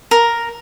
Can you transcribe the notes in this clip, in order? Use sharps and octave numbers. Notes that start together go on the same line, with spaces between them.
A#4